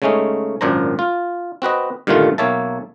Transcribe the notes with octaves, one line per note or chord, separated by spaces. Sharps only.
C#3 G#3 A3 C#4 D#4
G#1 F#2 A#2 D4 C5 A#5
F4
C4 F#4 B4 D#5
G2 A#2 D3 D#3 A3 F4
B1 A#3 C#5 E5 A5